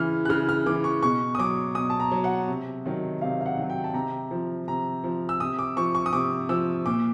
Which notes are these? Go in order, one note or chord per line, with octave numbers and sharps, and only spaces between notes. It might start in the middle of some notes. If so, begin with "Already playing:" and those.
Already playing: C#3 E3 F6
F#6
C#3 F6
F6
E3 D6
C#6
B2 C#6
D#6
F#3 D6
B2 D#6
A5
A#5
F#3
F#5
C3
D#3 F#3
C3 F5
F5
F#5
D#3 F#3
G5
A5
C3 A#5
F3
C3 A#5
F3
E6
C3 D#6
D6
F3 C#6
C#6
D#6
C3 D6
F3 E6
A#2 D6